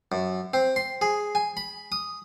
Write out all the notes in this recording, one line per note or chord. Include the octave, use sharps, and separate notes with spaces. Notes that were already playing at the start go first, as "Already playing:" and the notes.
F#2
C4
C6
G#4
G#5
B5
D#6